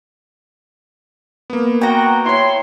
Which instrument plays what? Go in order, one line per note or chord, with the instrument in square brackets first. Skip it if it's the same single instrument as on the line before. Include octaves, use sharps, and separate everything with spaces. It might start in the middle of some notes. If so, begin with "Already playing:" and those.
[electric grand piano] A#3 B3
[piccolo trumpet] F#4 [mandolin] G5 A#5
[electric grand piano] E4 C#5 [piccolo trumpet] C6